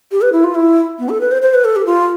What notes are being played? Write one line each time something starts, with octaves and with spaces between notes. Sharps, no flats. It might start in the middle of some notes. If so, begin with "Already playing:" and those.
G4
B4
E4
F4
E4
B3
A4
B4
C5
C5
B4
A4
G4
F4